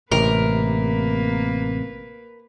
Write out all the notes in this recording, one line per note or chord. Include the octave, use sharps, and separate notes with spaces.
A1 C3 A#3 A#4 B4